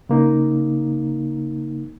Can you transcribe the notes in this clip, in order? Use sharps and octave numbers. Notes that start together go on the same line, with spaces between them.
C#3 A#3 D#4